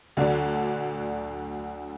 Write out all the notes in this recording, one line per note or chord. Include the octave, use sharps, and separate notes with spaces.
D2 D3 F#3 D4